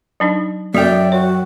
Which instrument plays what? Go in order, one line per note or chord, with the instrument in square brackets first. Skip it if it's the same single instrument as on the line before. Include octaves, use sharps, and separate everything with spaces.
[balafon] F#3 D4 D#4
[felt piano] F#2 [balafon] F#3 A4 [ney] D5 [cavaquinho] E5 G5
[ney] F#4 [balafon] C#5